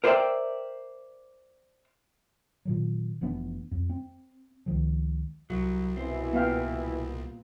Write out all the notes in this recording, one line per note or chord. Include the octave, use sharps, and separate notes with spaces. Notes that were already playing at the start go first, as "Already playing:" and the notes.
A#4 C5 D5 E5 G5
A#2 D#3 F#3
F1 E3 B3 D4
F2
C4
C#2 D#3 F3
C2 F#3
B2 E3 C4 E4
A#2 B3 F5 G5